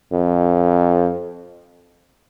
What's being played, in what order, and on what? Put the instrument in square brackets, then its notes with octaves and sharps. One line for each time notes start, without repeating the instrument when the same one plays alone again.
[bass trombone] F2